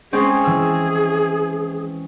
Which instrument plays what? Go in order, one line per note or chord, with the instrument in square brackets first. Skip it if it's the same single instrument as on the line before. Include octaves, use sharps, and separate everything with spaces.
[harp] G#3 C4 C#4 [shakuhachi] G#4
[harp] E3 E6